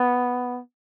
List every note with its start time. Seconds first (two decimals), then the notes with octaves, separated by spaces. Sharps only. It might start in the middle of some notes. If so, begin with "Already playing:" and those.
Already playing: B3